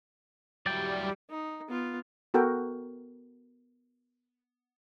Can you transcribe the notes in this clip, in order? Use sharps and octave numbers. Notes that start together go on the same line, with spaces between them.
F#3 G3 E4 D5 G5
D#4
B3 F4
B3 F#4 A4 A#4 G5